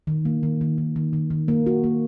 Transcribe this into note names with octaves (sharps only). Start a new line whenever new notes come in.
D#3
A#3
D#3
D#3
D#3
D#3
D#3
D#3
A#3
F#4
A#3